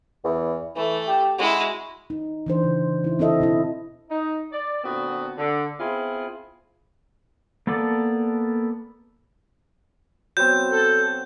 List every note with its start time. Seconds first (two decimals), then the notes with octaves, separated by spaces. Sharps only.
0.25 E2
0.76 E3 A3
1.08 G4
1.39 G#3 E4 F#4
2.10 D#4
2.46 E3 D4 C5
2.64 C#3
3.04 D#4 E4
3.19 C4 D4 E4 A4 D#5 E5
3.40 B2 C4 E4
4.09 D#4
4.52 D5
4.83 A#2 D3 B3 C4 F#4
5.37 D3
5.79 B3 C4 E4 F4 G#4
7.67 A#3 B3 A4 D5 A5
10.37 F#3 B3 C4 G6
10.72 A4